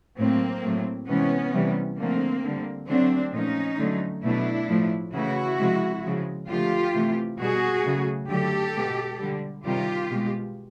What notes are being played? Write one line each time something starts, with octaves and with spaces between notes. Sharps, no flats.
A2 F#3 A3 A#3 C4
A2 F#3 A3
C3 E3 G#3 B3 C#4
C3 E3 G3
D3 F3 A3 A#3 C4
D3 G3
D3 F#3 A3 C4 D4
A#2 F3 A3 C#4 D#4
D3 F#3 A3
B2 F#3 A3 D4 E4
A2 F3 A3
C#3 E3 A3 E4 F#4
C3 F3 G#3
C#3 F3 G#3
D3 F3 A3 F4 G4
C3 E3 A3
B2 G3 F#4 G#4
C#3 F#3 A3
D3 F#3 A3 G4 A4
B2 G#3
D3 G3
C3 D#3 G3 F4 G4
B2 G#3